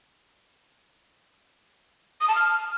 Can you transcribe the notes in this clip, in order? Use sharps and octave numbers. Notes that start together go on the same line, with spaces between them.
D#6
A5
F6